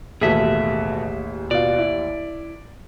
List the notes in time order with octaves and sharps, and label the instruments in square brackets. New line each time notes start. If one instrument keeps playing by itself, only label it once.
[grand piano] A1 D#2 [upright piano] B2 A4 B6 [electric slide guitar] G#4 E5
[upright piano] B2 F4 [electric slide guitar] D5
[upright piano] E4